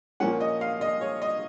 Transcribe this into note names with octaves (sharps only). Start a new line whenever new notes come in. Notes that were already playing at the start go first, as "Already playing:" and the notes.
A#2 F3 A#3 C#4 F#5
D#5
F5
D#5
C#5
D#5